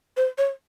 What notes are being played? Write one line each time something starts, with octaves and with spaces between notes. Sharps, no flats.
C5
C#5